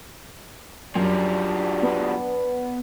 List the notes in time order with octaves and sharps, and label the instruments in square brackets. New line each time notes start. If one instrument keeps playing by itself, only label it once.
[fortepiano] F#2 [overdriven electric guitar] F3 G3 [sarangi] D4
[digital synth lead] B3